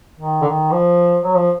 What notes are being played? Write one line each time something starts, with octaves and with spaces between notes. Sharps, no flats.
D#3
D3
D#3
F3
F#3
F3